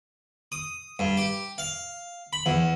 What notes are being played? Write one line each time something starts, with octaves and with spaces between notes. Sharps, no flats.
D#6
G2
G4
F5
B5
E2